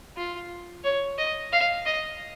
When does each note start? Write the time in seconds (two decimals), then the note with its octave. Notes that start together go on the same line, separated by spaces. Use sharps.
0.17 F4
0.84 C#5
1.18 D#5
1.52 F5
1.85 D#5